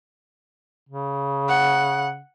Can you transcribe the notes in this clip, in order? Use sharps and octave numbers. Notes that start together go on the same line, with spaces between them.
C#3
F#5